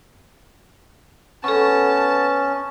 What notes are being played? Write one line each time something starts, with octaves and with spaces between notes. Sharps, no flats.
B3 C#4 A4 A5 C#6